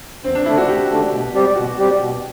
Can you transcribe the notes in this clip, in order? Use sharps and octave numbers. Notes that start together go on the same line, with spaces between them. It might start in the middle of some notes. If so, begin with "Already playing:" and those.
E2 C4
D4
D3 A3 D4 E4
F#4
E2 G4
D3 A3 D4
B2
G3 C4 G4 D5
B2 F#4
G3 C4 G4 D5
B2